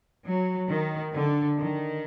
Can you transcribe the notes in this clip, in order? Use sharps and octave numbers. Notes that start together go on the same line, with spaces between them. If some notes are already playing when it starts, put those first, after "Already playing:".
F#3
D#3
D3
D#3